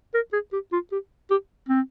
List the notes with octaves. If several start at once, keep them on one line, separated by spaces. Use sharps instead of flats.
A#4
G#4
G4
F4
G4
G4
C4